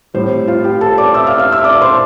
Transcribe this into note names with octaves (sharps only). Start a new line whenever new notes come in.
A2 G3 C4 C5
F4 F5
G4 G5
A4 A5
D5 D6
E5 E6
F5 F6
F5 F6
E5 E6
D5 D6
C5 C6